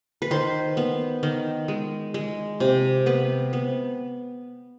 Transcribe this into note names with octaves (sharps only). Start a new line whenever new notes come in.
B4
D#3 C5
B3
D#3
G#3
G#3
C3
B3 B4
B3